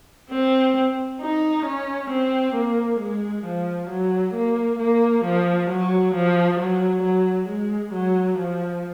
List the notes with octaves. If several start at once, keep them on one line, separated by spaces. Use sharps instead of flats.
C4
D#4
C#4
C4
A#3
G#3
F3
F#3
A#3
A#3
F3
F#3
F3
F#3
F#3
G#3
F#3
F3